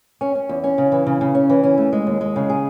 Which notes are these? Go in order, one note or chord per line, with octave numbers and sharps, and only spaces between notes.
C#4
C#4
E2
C#4
C#3
E3
C#3
C#3
C#4
E3
C#4
A3
G#3
D#2
G#3
C#3
G#4